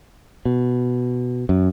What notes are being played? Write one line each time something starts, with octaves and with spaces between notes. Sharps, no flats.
B2
F#2